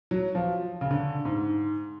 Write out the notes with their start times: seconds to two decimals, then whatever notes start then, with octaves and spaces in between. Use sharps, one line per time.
0.11 F#3
0.35 F3
0.81 C#3
0.91 D3
1.25 G#2